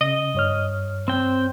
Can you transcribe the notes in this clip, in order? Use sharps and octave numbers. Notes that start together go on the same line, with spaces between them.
C#3 D#5
G2 C#5 F6
C4 G5